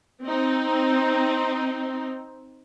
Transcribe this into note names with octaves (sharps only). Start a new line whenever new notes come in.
C4 D#4